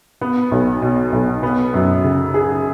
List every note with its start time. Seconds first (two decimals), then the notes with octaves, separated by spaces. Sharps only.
0.21 B3
0.51 B1
0.82 B2
1.12 B1
1.43 B3
1.74 F#2
2.04 C#3
2.34 G#4